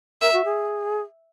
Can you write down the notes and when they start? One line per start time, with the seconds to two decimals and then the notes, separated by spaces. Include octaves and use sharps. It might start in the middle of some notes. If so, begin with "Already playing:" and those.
0.21 A#4 E5
0.33 F#4
0.45 G#4